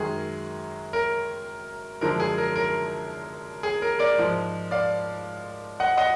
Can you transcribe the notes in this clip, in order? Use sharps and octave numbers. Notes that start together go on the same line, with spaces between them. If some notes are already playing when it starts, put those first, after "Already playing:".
Already playing: F#2 D#3 G#3 G#4
A#4
F#2 D3 F3 G#3 A#4
G#4
A#4
A#4
G#4
A#4
A#4 D5
G#2 F3 G#3
D5 F5
D#5 F#5
D#5 F#5